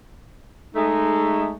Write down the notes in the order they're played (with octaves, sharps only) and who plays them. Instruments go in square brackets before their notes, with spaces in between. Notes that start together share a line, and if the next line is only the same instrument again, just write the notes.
[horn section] G#3 A3 [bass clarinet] D#4